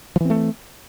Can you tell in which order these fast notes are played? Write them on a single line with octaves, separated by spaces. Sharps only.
F3 E3 C4 A3